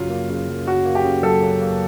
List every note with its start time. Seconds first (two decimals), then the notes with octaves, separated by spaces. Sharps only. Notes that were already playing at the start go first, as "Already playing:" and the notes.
Already playing: F#2 C#3 F#3 F4
0.10 A#3
0.29 C#3
0.48 F#2
0.67 F#3 F#4
0.85 A#3
0.95 G4
1.04 C#3
1.23 F#2 A4
1.42 F#3
1.61 A#3